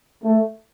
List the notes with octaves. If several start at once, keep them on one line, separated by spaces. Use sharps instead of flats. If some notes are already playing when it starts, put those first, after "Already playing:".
A3